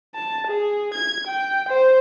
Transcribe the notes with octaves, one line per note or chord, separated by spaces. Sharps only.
A5
G#4
G#6
G5
C5